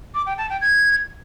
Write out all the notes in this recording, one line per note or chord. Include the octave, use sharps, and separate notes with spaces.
D6
G5
A5
G5
G#6